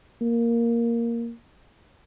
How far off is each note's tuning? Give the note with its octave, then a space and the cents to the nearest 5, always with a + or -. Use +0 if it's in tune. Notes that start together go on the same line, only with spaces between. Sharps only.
A#3 +0